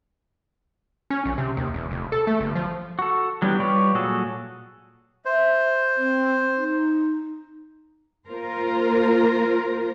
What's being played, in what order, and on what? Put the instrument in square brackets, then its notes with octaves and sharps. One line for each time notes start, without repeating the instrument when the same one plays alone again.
[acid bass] C#4
A#1
C3
D#2
E1
F1
A4
A3
G1
F3
[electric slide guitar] F#4 A4
F#3 G3 B3 D4 E4 G4
G3 F4 G4 B4 C#5
A#2 F#3 F#4 G#4 A4
[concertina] C5 [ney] E5
[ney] C4
D#4
[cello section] A#3 F4 A#4 C5